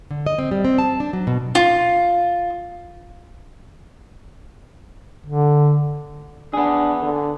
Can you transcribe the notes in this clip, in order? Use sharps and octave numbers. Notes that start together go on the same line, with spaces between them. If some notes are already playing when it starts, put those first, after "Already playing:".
D3
D#5
C4
G3
C4
A5
D4
F#3
B2
F4
D3
B3 D4 G#4
D3